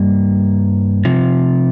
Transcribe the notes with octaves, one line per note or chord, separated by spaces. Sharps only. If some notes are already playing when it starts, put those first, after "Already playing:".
Already playing: G2 G3 A#3
C3 F3